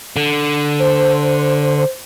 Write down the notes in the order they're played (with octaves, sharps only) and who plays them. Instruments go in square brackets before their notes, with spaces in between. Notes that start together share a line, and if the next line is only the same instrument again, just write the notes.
[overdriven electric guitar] D3
[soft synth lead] C5